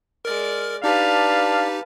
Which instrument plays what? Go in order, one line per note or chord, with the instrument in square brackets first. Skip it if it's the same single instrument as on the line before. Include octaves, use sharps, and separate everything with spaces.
[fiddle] G#3 D5 [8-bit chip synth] A#4 F6
[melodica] D4 D5 [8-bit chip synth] D#4 G4 [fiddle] B4 A5 [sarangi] F5